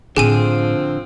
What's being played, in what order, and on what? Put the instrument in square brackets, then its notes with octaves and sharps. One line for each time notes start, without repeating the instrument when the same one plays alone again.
[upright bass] A2 [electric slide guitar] D3 [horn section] F3 C4 [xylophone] G#4 G#5 D#7